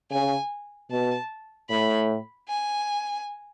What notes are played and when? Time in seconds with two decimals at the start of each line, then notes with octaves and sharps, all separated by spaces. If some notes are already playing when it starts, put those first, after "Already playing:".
0.11 C#3 G#5
0.91 B2 A5
1.69 A2 B5
2.48 G#5